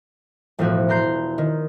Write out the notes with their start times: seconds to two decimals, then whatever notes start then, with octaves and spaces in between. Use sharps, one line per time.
0.59 E1 A2 F3 F#4
0.88 E3 A#5 C6 G6 C7
1.38 D#3